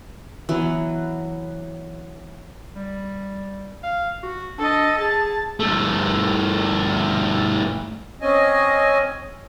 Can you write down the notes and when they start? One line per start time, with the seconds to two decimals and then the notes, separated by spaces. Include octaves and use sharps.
0.49 E3 F#3 B3
2.76 G3
3.83 F5
4.23 F#4
4.58 D4 A4 D#5
4.99 G#4 A5
5.60 G2 A3
8.22 C4 C#4 D#5 G#5